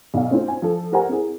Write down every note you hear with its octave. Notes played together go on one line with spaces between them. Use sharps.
B1 F5
A3 C4 C#4 D#4 F4 C5
G#5
F3 A4
G4 A#4 C5 F#5 G#5 A#5
C4 E4 G#4